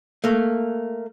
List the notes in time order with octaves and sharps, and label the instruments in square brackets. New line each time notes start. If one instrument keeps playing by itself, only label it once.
[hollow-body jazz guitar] A3 A#3